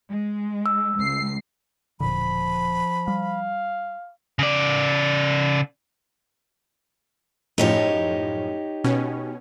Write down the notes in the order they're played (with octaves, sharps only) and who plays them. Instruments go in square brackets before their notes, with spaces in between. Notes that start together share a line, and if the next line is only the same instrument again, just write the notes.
[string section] G#3
[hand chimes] E6
[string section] C#2 C7
[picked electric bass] E1 A#2 D3 [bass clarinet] F3 [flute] B5
[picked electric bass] G3 [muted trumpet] F5
[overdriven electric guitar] C#3 D5
[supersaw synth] F#2 A2 F3 [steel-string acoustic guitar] D#4 G4 C#5
[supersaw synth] B2 C#4